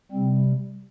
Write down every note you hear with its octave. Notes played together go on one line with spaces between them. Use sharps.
C3 G3 C4